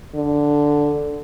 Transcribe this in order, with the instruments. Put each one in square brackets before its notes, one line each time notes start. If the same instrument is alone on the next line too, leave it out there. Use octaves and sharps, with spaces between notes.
[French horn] D3